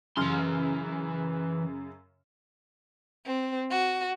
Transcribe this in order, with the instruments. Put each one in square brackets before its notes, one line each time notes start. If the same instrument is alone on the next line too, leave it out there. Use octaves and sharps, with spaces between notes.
[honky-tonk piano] F#2 C#3 F6 [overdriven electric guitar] E3 C6
[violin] C4
F#4